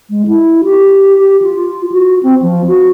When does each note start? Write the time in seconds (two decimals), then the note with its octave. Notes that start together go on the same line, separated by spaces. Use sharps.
0.10 G#3
0.28 E4
0.64 G4
1.19 G4
1.42 F4
1.92 F#4
2.23 C4
2.42 F3
2.68 F#4